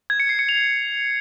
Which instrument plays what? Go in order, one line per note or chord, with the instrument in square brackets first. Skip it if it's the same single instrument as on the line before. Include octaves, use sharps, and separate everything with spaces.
[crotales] G#6
C#7
C7
C#7
F7